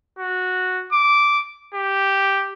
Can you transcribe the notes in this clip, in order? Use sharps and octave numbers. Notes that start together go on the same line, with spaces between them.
F#4
D6
G4